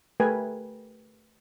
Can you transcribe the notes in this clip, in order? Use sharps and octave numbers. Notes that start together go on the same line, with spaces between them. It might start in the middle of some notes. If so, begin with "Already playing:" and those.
A3 G4 A#4 B4 G5 G#5